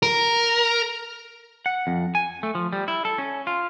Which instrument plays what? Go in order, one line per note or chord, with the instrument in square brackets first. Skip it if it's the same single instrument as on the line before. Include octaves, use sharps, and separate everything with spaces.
[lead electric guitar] A#4
[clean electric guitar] F#5
F2
G#5
A3
F3
G3
E4
A4
C#4
F4